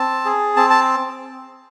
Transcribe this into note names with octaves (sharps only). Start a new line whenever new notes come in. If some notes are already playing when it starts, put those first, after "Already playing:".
Already playing: C4 A5
G#4
C4 A5
A5